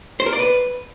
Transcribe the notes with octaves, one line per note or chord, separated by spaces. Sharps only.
C5
A#4
D5
B4